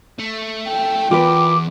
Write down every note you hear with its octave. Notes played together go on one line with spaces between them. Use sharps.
A3
G5
E2 F4 A#4 B4 D6